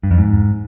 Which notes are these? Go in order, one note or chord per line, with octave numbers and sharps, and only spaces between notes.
G2
F2
G#2